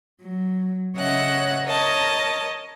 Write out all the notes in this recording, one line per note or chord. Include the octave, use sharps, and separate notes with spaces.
F#3
C#3 C#5 D#5 E5 F#5 F#6
A#4 C#5 D#5 A5